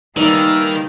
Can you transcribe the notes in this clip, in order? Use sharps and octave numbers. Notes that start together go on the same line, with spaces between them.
D#3 G3 A#3 D#4 G#4 B4 D5 E5